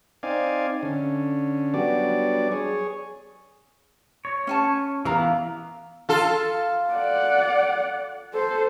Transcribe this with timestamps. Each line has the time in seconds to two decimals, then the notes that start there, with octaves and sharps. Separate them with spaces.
0.23 C4 D#4 D5 F5 G#5
0.83 D3 C#4
1.74 F#3 G3 B3 D4 D5
2.52 G#4 C#5
4.25 C#5
4.47 C#4 G#5 A5
5.05 E3 B3 A#4 F5 A#5
6.09 F4 A4
6.93 D5 F#5
8.34 A4 C5